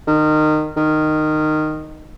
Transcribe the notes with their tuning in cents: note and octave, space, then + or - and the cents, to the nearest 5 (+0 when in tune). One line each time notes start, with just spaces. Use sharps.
D#3 -20
D#3 -15